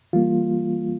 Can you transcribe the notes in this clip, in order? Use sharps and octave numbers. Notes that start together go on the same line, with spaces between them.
E3 G3 A#3 F4